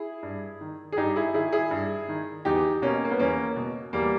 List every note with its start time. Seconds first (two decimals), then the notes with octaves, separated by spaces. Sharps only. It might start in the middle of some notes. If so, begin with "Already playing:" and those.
Already playing: E4 G#4
0.23 G2
0.61 D#3
0.92 G#4
0.97 G2 D#4 G4
1.16 E4 G#4
1.34 D#3 E4 G#4
1.52 E4 G#4
1.71 G2
2.08 D#3
2.45 E2 D#4 G4
2.82 B2 A#3 C#4
3.05 A#3
3.11 B3
3.19 E2 A#3 C#4
3.56 B2
3.93 E2 G3 A#3